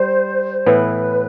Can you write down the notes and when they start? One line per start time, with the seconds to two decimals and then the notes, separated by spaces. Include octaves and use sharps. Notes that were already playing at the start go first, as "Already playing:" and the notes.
Already playing: G3 C5
0.66 A2 E3 B3 E4 B4